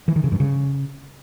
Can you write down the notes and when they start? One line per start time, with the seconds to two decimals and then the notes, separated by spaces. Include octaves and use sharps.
0.08 E3
0.16 D#3
0.24 C#3
0.32 G2
0.40 C#3